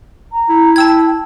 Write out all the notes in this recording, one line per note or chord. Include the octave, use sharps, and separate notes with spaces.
A#5
E4
G5 A5 E6 G#6